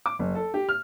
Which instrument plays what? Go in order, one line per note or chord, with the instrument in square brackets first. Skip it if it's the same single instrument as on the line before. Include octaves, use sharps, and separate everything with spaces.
[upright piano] D6
F#1
A4
G4
F6